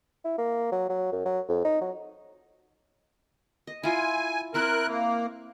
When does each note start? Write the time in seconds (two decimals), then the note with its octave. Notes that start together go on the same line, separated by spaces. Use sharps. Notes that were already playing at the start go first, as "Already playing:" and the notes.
0.25 E4
0.38 A#3
0.72 F#3
0.89 F#3
1.12 F#2
1.26 F#3
1.49 F2
1.64 D#4
1.81 F#3
3.67 D#5
3.83 E4 F4 G#5
4.54 C4 E4 A#4 B5 F#6
4.87 A#3